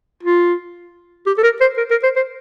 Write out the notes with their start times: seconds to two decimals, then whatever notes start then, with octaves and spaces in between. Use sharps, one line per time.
0.23 F4
1.26 G4
1.38 A4
1.43 A#4
1.61 C5
1.77 A#4
1.91 A#4
2.03 C5
2.16 C5